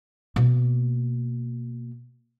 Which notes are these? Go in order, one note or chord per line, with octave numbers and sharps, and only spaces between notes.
B2 A#3